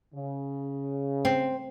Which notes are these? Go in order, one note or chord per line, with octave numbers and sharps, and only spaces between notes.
C#3
C4